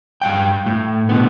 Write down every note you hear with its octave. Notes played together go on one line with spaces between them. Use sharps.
G2 F5 G5
A2
B2 D3 B3